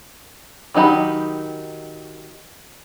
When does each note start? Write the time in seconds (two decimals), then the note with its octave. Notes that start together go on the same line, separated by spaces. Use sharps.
0.74 D#3 F#3 D#4 G4 B5